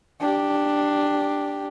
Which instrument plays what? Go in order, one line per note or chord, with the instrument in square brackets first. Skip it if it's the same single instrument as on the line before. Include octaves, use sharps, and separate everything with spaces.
[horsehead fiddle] D4 G4